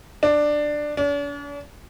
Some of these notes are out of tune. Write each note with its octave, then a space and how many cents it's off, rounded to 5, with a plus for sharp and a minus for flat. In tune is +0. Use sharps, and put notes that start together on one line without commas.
D4 +10
D4 -45